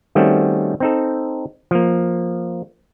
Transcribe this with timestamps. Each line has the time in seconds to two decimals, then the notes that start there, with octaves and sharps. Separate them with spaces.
0.15 D#3 G3 A3 C4 C#4 F#4
0.80 C4 D#4 A4
1.71 F3 A#3